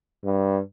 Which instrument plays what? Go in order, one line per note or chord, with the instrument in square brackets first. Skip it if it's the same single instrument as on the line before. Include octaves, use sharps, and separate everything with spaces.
[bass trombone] G2